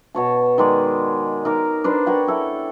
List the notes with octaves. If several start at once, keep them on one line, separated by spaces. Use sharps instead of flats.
B2 C#5 A5
D#3 G#3 D5
D#4 A#4 D6
D4 B4 C5 D5
A#4 C#5 F#5 G5
E4 A4 C#5